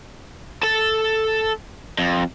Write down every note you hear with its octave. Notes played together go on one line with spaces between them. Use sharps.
A4 A5
F2